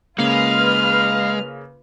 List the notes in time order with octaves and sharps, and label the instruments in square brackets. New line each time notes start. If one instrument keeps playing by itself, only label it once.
[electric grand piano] C#3 A#3 [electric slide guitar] G#3 [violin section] F4 B4 F6 [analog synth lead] F5